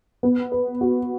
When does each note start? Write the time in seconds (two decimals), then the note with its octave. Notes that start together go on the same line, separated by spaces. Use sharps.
0.23 B3
0.52 B4
0.81 F#4